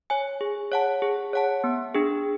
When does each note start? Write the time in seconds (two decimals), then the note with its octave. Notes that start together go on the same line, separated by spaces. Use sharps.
0.10 C#5 G#5
0.41 G#4
0.72 C#5 F#5 A5
1.02 G#4
1.33 C#5 F#5 A5
1.64 B3
1.94 D4 G#4